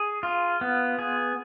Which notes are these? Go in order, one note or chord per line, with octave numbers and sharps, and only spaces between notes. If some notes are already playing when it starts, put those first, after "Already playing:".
Already playing: G#4
F4
B3
G#4